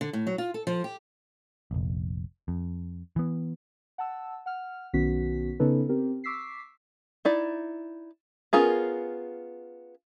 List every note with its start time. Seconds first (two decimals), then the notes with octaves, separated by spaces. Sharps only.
0.01 D3
0.13 A2
0.27 F#3
0.38 F4
0.54 A4
0.67 F3
0.84 G4
1.71 F1 A#1
2.48 F2
3.16 E3 B3
3.98 F#5 A5 E6
4.46 F#5 F6
4.93 B1 D#3 B3 C#4 F#4 B6
5.60 C#3 B3 C#4 D#4 A4 B4
5.89 C4 G4 A#4
6.24 C#6 D6 E6 B6 C7
7.25 D#4 E4 D5
8.53 B3 C#4 F4 G#4 A#4